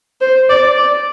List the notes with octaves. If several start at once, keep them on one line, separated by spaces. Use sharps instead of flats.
C5
D5
D5